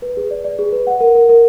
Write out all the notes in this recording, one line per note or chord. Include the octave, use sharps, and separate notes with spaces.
B4
G#4
D5
D5
G#4
B4
F#5
A#4
A#4
A#4